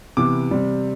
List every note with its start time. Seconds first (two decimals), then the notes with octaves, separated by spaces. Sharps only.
0.17 C3 E3 B3 D6
0.51 C3 G3 C4